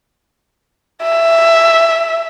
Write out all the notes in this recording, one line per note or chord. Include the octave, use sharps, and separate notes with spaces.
E5